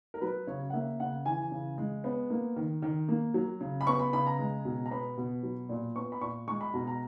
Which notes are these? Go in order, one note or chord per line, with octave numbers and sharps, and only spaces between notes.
A#4
F#3 B4
C#3 C#5
F#5
A#3 E5
C#3 F#5
E3 G#5
C#3
G#3
B3
A#3
D#3
D#3
A#3
F#3
C#3
B5
B3 C#6
B5
C#3 B5
A#5
G#3
B2
A#5
B3 B5
B2
F#3
A#2
B3 C#6
B5
A#2 C#6
G#3 C#6
B5
B2 A#5
A#5